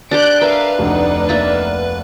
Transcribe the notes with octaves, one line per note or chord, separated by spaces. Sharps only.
D4 G4 D6 F#6 G6 D7
A#4 B4 E5 F5
F1 D2 D4 D#4 D5
A#3 E5 A5